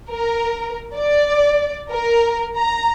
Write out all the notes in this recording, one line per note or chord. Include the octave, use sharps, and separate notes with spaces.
A#4
D5
A#4
A#5